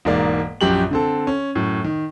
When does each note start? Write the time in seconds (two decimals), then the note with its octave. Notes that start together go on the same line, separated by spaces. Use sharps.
0.05 E1 G#2 A#3 D5
0.61 A#1 F#2 G4 F#7
0.91 D3 C4 A4
1.27 C#4
1.55 F#2 A2
1.84 D#3